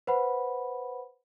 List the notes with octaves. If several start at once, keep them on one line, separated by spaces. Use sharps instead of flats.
B4 C5 F#5 B5